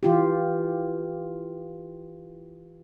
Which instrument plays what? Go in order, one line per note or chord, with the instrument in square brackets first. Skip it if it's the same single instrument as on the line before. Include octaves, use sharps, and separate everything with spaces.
[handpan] E3 F4 G4